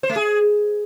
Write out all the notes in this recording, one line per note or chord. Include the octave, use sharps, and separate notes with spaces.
C5
A3
G#4